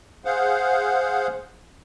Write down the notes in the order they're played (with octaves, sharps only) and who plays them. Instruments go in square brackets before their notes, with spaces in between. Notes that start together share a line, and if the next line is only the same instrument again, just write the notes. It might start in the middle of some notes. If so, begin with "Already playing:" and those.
[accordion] G#4 C5 F5 F#5